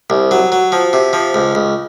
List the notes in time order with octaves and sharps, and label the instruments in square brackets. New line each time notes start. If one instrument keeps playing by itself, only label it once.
[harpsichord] C2
F#3
F#3
F3
C3
F3
C#2
C#2